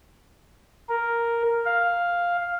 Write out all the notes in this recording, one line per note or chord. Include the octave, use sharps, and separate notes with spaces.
A#4
F5